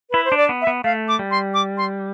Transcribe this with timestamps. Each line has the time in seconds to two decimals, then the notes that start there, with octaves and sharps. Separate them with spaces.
0.11 E4 B4
0.25 C5
0.32 D4
0.37 D5
0.49 B3
0.62 E5
0.67 B3
0.84 A3 F5
1.08 D6
1.19 G3
1.31 C6
1.54 D6
1.78 C6